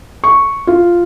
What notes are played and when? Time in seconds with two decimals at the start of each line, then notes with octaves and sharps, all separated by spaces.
0.24 C#6
0.67 F4